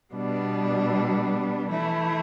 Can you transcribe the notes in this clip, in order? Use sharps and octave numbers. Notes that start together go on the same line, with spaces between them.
B2 G3 B3 D4
E3 A3 E4